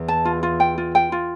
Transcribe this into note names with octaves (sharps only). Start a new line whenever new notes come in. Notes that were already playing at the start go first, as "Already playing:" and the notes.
Already playing: E2
A5
F4
F4
G5
F4
G5
F4